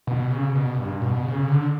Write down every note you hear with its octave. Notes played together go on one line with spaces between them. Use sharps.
B2
C#3
B2
G2
B2
C#3
D3